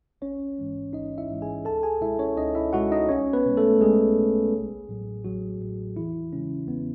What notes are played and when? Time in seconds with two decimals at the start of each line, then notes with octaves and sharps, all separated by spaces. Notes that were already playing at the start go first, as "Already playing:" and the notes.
0.21 A1 C#4 C#5
0.58 G#2 E3 G#3
0.93 A1 D#4 D#5
1.18 E4 E5
1.29 G#2 E3 G#3
1.42 G#4 G#5
1.65 C#2 A4 A5
1.83 G#4 G#5
2.01 B2 G#3 E4 E5
2.19 C#4 C#5
2.37 C#2 D#4 D#5
2.55 E4 E5
2.73 B2 G#3 F#4 F#5
2.92 D#4 D#5
3.09 B1 C#4 C#5
3.33 B3 B4
3.46 B2 G#3
3.57 A3 A4
3.81 B1 G#3 G#4
4.18 B2 G#3
4.53 A1
4.89 A2 F#3
5.25 A1 F#3 F#4
5.60 A2 F#3
5.96 E2 E3 E4
6.33 C#3 G#3 C#4
6.68 E2 B3